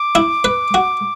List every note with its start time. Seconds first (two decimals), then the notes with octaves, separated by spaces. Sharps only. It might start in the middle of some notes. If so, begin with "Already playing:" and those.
Already playing: D6
0.15 E4
0.44 B4
0.74 F#4